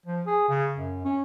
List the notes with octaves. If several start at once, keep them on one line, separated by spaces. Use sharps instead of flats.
F3
G#4
C#3
F#2
C#4